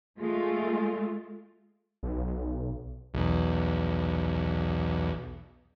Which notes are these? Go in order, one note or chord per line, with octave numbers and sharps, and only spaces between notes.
G#3 A3 F4 G#4
B1
B1 E2